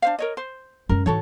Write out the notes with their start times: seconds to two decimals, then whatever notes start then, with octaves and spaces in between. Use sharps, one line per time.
0.02 D4 C5 F5
0.19 A#4 C#5 D#5
0.37 C5
0.89 F#2 G#3 A#4
1.06 G#2 E3 F#4 A4 C#5